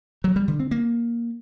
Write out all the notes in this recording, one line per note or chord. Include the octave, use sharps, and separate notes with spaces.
F#3
G3
D3
C4
A#3